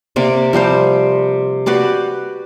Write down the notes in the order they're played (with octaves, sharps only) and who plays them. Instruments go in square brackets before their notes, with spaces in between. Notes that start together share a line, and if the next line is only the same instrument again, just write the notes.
[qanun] C3 A#3 D5
F3 G3 G4 C5
F#4 G4 B4 D5